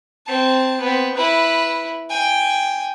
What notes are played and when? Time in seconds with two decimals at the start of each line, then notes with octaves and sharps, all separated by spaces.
0.26 C4 A5
0.80 B3 C4
1.15 E4 B4
2.10 G5 G#5